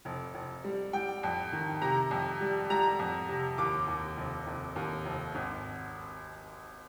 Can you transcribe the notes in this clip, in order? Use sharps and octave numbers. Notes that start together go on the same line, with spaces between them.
F1
F1
G3
G3 G5
F2
D#3
C3 A#5
F2
G3
G3 A#5
F2
C3
D#2 D6
D#2
F1
F1
D#2
F1
G#1